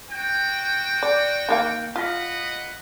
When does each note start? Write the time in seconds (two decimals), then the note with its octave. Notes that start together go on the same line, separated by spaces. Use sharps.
0.11 F#4 G5
1.03 D5
1.49 D#3 A#3 F5
1.96 F4 D#5 F#5 B5